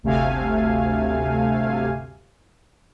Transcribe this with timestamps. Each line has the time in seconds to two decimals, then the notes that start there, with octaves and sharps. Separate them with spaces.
0.03 G1 D2 C3 A3 F5 G#5